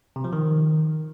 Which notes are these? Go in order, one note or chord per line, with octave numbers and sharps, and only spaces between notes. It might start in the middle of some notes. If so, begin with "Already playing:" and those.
C3
F3
D#3